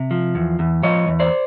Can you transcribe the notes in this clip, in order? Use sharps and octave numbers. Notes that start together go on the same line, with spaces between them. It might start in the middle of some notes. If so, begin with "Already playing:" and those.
Already playing: C3
F3
E2
E2
F3 C#5 D#5
E2
C5 D5